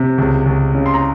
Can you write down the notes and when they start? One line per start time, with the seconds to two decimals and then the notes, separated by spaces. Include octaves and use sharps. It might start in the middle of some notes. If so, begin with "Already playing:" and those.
Already playing: C3
0.18 C#2
0.46 C#2
0.74 C#3
0.86 C6
0.94 A#5